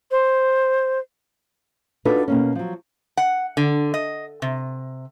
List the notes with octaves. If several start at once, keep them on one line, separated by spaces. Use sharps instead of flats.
C5
D4 D#4 F4 F#4 A4 B4
B2 A#3 C#4
F3 F#3
F#5
D3
D#5
C3